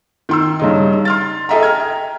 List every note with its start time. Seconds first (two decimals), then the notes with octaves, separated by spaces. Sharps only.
0.29 D#3 C6 E6
0.59 G2 C#3 D#4
1.05 C6 F6 A6
1.49 G#4 A4 D#5 E5 G5 A#5
1.63 A#5 F6 G#6
1.80 G5